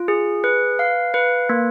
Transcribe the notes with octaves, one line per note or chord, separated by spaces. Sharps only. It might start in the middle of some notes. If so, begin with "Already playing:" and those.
Already playing: F4
G#4
B4
F5
B4
A#3